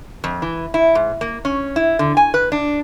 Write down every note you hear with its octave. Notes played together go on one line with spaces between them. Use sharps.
F2
E3
E4
G#2
A#3
C#4
E4
D3
G#5
B4
D4